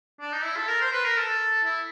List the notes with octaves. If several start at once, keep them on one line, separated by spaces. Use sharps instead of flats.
D4
D#4
E4
A4
A#4
C5
B4
A#4
A4
E4